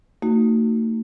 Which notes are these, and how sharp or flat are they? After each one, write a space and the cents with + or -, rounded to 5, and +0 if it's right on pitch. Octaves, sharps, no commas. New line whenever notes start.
A3 +45 D#4 +0 F#4 +0